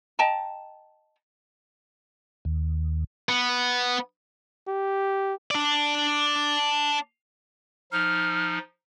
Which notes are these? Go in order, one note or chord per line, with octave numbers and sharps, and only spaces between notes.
D#5 G5 A5 A#5
D#2
B3
G4
D4 D5
F3 D#4 F6